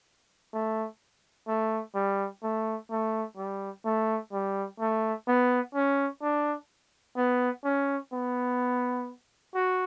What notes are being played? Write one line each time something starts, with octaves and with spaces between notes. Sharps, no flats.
A3
A3
G3
A3
A3
G3
A3
G3
A3
B3
C#4
D4
B3
C#4
B3
F#4